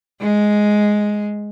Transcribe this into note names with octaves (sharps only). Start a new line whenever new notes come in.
G#3